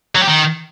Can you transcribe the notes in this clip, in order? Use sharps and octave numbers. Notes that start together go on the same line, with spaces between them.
F#3
G4
D#3